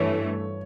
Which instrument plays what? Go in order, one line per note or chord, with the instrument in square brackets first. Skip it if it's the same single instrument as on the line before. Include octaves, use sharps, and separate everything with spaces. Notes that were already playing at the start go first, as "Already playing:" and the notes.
Already playing: [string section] G2 E3 A3 [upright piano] C#5